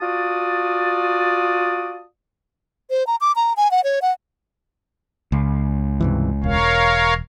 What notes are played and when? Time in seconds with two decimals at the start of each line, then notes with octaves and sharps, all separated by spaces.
0.01 F4 F#4 D5 A5 D#6
2.90 C5
3.07 A#5
3.21 D6
3.36 A#5
3.57 G#5
3.71 F#5
3.84 C#5
4.02 F#5
5.32 C#2
6.01 G2 C3 E3
6.44 E1 A#4 C#5 F5